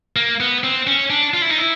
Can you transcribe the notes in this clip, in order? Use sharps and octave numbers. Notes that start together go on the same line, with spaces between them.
A#3
B3
C4
C#4
D4
F4
E4
D#4
E4